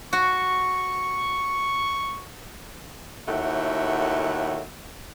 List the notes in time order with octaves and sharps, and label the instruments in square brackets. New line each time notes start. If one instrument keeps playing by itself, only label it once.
[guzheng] F#4 [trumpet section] C#6
[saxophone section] D#2 A2 A3 F#4 E5 F#5